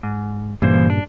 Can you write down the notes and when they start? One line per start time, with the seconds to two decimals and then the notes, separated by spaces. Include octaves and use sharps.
0.03 G#2
0.62 G2 A#2 C#3 E3 A#3 C5
0.90 D4